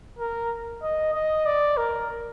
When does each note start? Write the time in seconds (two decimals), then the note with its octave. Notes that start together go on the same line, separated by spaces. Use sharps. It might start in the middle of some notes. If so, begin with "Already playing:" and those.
0.18 A#4
0.83 D#5
1.14 D#5
1.46 D5
1.77 A#4